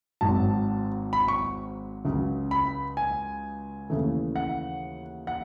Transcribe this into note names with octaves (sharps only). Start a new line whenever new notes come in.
G#1 G#2 F#3 A5
B5
C#6
C#2 C#3 F#3
B5
G#5
D#2 C#3 E3 A3
F#5
F#5